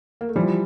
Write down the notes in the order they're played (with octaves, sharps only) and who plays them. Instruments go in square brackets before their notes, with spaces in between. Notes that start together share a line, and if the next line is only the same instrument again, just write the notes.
[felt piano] A#3
A3
[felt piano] E3 G3 [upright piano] F3